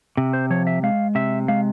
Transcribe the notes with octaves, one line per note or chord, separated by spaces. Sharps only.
C3
C5
F3 C#5
E5
G#3 F5
C3 E5
G#3 F5